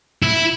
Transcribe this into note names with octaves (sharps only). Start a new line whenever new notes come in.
E4